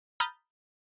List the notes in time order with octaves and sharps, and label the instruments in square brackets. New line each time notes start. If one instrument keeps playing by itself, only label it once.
[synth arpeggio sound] A#5 B5 D#6 F6 G6 A6